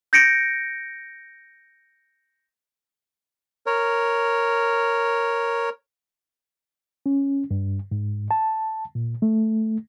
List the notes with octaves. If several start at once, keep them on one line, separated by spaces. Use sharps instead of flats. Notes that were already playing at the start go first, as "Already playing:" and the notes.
G6 A#6 C#7 D7
A#4 C#5
C#4
G2
G#2
A5
A#2
A3